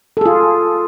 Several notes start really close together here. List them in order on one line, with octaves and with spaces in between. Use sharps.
A4 G#4 F4